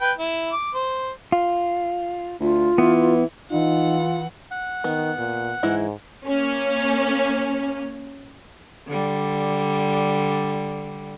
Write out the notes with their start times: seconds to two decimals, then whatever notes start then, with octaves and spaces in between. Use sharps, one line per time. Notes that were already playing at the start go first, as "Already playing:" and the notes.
0.01 B4 G5
0.18 E4
0.52 D6
0.74 C5
1.32 F4
2.41 D2 F4
2.78 E3 B3
3.51 E3 D#4 F4 F#5
4.51 F#5
4.84 D#3 B3
5.18 A#2
5.63 G#2 E3 G#3 E4
6.26 A#3 C#4
8.87 D3 G3